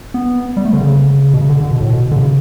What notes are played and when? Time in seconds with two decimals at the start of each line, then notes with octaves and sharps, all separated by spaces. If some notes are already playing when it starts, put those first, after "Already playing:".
0.14 B3
0.57 G3
0.65 A3
0.73 D3
0.81 C#3
1.34 B2
1.41 C#3
1.50 D3
1.61 D3
1.71 B2
1.81 A2
1.90 B2
2.11 D3
2.17 C#3